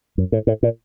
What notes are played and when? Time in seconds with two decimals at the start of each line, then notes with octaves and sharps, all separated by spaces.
0.18 F#2
0.32 A2
0.47 A2
0.63 A#2